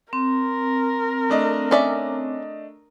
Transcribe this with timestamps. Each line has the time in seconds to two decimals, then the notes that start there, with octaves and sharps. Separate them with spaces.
0.13 C4 A#4
1.29 A3 D4 D#5
1.71 C#4 D5 E5